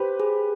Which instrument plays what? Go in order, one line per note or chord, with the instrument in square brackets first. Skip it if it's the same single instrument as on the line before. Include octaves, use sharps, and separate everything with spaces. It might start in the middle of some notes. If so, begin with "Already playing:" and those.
Already playing: [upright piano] G4 B4 [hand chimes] C5
[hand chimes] G#4